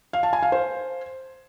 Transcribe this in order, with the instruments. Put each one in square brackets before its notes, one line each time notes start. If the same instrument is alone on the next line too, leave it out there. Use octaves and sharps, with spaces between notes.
[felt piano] F5
A5
G#5
F5
C5